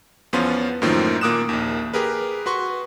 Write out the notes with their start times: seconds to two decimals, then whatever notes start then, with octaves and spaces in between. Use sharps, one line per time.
0.33 E2 F3 B3 C#4 F4 C6
0.82 F#2 A2 D#3 F3 A#3
1.21 A#2 A#3 D6 D#6 F#6 E7
1.49 A#1 D#2
1.94 G4 G#4 A#4 B4
2.46 F#4 B4 C6 C#6